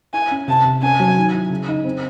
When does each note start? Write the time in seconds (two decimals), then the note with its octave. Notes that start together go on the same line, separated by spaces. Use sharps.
0.13 E4 G#5
0.31 C#4
0.48 C3 A5
0.65 C3
0.82 C#4 G#5
1.00 F#3
1.17 D#3
1.34 E4
1.50 C#3
1.69 D#4
1.85 C4